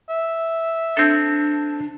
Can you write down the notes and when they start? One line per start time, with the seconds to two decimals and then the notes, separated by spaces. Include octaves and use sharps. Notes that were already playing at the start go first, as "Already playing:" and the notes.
0.09 E5
0.97 C4 D4 A4